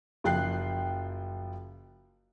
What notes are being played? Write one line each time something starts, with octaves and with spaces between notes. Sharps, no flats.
F#1 F3 G5 F#6 C7